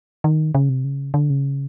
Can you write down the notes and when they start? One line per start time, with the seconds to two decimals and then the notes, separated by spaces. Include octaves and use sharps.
0.24 D#3
0.55 C#3
0.69 C3
0.84 C#3
1.14 D3
1.30 C#3